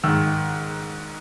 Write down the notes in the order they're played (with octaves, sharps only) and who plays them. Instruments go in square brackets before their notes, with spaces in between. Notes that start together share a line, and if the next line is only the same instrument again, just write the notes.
[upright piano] G#2 D#3 E6